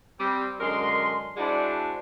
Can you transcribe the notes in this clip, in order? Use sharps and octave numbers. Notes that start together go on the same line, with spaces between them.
G3 C4
F#2 D3 G#3 A#4 C6
G#3 D4 E4 F#4 C5 D5